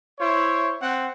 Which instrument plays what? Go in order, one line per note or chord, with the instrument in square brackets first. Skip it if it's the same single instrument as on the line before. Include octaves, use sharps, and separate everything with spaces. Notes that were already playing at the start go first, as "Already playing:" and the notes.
[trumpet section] E4 C5 C#5
C4 F#5